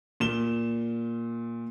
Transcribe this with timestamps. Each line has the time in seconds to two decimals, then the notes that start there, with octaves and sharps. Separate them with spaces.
0.20 A#2 E7 G7